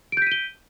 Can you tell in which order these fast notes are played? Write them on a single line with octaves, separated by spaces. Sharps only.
D7 G6 B6 D#7 G7